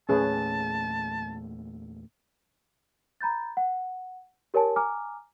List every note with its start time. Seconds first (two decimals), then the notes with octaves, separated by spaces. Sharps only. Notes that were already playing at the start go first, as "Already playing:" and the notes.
0.09 E2 A#2 A3 C#4 G#4 B4 A5
3.21 A#5 B5 G6 A6
3.57 F#5
4.54 G4 A#4 C#5 G#5 A5
4.76 G#5 A#5 D6 F6